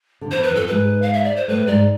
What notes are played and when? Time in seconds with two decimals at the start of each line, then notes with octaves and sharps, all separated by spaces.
0.21 D3
0.31 E2 E3 C5
0.43 B4
0.51 F2 F3 A4
0.67 G#2 G#3 B4
1.02 F5
1.13 E5
1.24 D5
1.36 C5
1.48 A2 A3 B4
1.67 G#2 G#3 D5